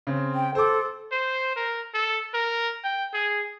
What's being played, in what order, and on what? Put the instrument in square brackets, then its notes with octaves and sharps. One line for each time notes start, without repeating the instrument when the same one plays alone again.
[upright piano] C#3 C4
[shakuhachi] G5
[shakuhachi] A4 [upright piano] C5 D6
[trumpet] C5
A#4
A4
A#4
G5
G#4